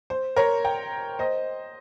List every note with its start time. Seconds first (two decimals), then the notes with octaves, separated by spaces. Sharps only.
0.10 C5
0.36 A#4 C#5
0.65 G5 A#5
1.19 C5 D#5